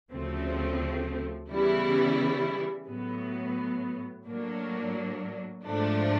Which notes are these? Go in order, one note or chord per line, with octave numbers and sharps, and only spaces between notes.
D2 C#3 F3 A3 C4
C#3 E3 G3 B3 E4
A2 F#3 B3
A2 F#3 A#3 D4
G#2 F3 A3 D4